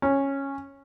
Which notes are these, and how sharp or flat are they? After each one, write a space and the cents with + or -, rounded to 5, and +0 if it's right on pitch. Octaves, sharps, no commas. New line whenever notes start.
C#4 -10